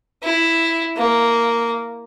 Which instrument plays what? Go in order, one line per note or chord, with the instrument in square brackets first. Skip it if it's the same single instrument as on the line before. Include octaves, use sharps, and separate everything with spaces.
[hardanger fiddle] E4
A#3